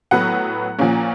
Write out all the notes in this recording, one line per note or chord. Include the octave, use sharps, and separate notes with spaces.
A2 F#3 B3 F#5
A#2 F3 A#3 C#4